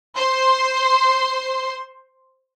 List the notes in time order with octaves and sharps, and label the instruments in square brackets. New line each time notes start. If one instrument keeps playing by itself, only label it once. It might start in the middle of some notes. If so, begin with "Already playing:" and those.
[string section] C5 C6